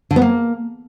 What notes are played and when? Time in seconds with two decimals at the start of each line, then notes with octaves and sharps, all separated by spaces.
0.11 D3
0.16 B3
0.22 A#3